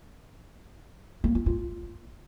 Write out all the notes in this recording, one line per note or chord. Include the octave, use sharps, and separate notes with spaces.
A#3
F4
F4